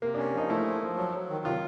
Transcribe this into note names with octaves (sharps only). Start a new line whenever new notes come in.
C3 A#3
C#4 D4
F3 D#4
A3 E4
F3
F3
F#3
F#3
D#3
C3 F4